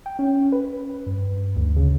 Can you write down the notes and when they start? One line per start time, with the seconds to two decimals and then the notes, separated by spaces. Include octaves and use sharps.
0.06 G5
0.19 C#4
0.52 B4
1.06 G2
1.56 D2
1.76 C#3